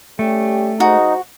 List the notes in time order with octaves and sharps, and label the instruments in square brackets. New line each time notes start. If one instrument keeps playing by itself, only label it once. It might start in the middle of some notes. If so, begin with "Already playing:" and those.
[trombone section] G3 C#4 G4 [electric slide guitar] A3
[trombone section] G#2 G#3 C5 [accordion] D#4 [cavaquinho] F#4